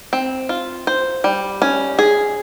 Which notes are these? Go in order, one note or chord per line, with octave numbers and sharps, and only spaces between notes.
C4
F4
C5
G3
C#4
G#4